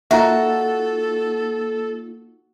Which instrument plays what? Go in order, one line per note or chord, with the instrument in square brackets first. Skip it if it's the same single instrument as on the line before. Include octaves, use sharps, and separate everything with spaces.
[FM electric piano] A#3 D#4 F4 [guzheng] F#4 [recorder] A4 [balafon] E5 A#5